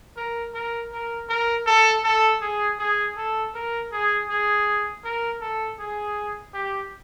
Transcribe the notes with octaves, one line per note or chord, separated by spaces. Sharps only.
A#4
A#4
A#4
A#4
A4
A4
G#4
G#4
A4
A#4
G#4
G#4
A#4
A4
G#4
G4